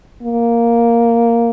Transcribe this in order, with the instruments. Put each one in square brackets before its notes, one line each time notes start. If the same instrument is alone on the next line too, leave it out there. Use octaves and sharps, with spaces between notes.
[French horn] A#3